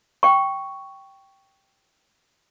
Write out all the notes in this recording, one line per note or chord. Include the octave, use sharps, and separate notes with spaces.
G5 C#6